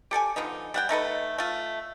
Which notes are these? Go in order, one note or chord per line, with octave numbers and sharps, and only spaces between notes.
G4 A4 D5 G#5
D3 F3 B3 D#4
G3 F#5 G5
A3 D#4 A4 B4
A3 F4